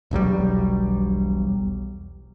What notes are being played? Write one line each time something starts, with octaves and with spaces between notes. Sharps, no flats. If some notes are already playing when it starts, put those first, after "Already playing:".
E1 B1 F#3 G3